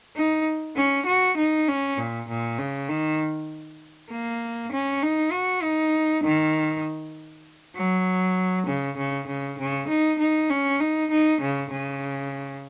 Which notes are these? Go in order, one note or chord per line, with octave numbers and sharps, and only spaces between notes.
D#4
C#4
F#4
D#4
C#4
A#2
A#2
C#3
D#3
A#3
C#4
D#4
F#4
D#4
D#3
F#3
C#3
C#3
C#3
C#3
D#4
D#4
C#4
D#4
D#4
C#3
C#3